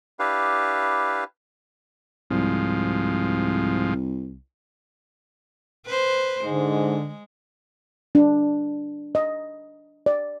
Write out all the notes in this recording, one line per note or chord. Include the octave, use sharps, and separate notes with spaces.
D4 E4 G4 B4 F5
C2 G#2 F3
B4 C5
G#2 D3 G#3
D4
D#5
D5